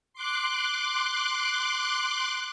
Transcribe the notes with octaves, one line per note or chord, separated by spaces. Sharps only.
C6 D6 F#6